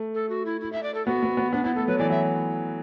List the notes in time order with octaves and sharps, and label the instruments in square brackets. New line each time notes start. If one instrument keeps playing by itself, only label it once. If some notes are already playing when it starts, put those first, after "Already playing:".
Already playing: [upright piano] A3
[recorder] A4
F#4
E4
E4
E5
D5
A4
[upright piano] B3 [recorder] F#4
[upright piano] B3
B3
[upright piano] B3 [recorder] D4
[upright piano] B3 [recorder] E4
[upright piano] A3 [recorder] A4
[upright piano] F#3 [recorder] B4
[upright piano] E3 [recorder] D5
[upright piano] F#3 [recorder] E5